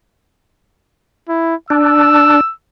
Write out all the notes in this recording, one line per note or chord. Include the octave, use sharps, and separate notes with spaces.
E4
D4 E6